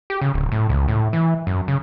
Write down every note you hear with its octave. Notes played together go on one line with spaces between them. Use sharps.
G4
C#3
D1
A2
C#2
A2
E3
F#2
C#3